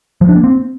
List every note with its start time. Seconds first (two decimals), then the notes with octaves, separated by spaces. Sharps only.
0.21 F3
0.29 D4
0.36 A#3
0.44 C4